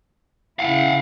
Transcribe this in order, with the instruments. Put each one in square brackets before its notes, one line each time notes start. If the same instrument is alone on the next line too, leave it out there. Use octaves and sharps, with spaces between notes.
[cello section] C#3 E4 [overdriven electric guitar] F5 F#5